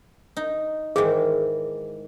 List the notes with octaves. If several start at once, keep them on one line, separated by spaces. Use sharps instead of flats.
D#4
G#2 D#3 E3 G#4